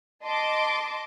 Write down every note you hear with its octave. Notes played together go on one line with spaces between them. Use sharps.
D#5 A5 C6 D6